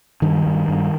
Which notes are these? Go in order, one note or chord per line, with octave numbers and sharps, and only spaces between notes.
G2 D#3
G2
G2